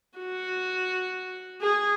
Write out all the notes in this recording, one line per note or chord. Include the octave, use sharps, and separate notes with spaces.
F#4
G#4